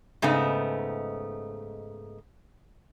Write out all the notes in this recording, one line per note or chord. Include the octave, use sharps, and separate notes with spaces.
G#2 C#3 A3 B3 D#4